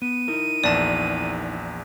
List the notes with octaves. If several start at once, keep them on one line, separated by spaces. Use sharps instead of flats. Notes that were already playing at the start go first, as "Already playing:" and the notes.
B3 D#7
D#4 E4 A#4
A#1 E2 D5 A5